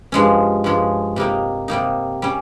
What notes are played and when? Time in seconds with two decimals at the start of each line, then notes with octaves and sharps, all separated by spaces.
0.12 G2 F3 G#3 C#4
0.64 G2 F3 G#3 C#4
1.16 C3 G3 A#3 D#4
1.68 C3 G3 A#3 D#4
2.22 G3 C#4